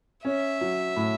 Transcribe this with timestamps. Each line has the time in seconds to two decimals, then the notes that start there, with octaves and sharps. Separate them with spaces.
0.25 C#4 E5
0.61 F#3
0.96 A2